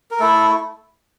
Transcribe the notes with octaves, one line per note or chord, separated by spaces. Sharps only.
A#4
A3 E4 A4